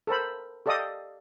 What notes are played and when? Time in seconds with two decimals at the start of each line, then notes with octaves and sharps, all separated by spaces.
0.07 A4 A#4 C5 B5
0.66 G4 A4 D5 D#5 F5 D#6